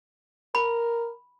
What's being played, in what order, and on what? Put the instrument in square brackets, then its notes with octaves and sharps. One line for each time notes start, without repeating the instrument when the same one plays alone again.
[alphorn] A#4 [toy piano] B5